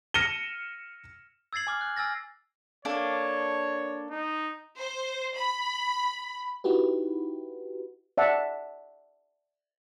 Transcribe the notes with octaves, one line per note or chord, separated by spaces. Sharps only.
F6 A#6 C#7 D#7 E7 G7
E6 G#6 A6 C7 F#7
G#5 D6 F6
F#6
G#5 E6 F6 A6 A#6
A#3 D4 A4 C#5
D#4
C5
B5
D#4 E4 F#4 G4 B4
D5 E5 F#5 A5